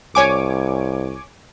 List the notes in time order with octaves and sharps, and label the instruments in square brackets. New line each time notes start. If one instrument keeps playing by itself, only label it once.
[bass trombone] C2 [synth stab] C#5 G#5 D6